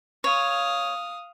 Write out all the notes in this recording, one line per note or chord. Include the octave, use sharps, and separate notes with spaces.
C#5 F5 D#6